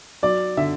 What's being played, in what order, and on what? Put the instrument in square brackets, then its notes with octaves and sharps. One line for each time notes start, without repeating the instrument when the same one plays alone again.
[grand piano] F#3 D5
D3 E5